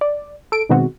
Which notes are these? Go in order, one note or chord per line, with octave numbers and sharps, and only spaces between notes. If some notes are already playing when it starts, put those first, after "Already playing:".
D5
A4 D7
B2 D#3 G#3 B3 C4 F#4